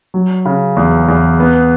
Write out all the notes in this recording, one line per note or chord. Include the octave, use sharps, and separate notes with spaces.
F#3
C#3
E2
E2
B3